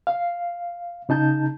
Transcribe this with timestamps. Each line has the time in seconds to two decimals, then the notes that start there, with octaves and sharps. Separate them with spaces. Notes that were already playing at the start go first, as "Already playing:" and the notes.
0.07 F5
1.09 C#3 D#4 A5 G6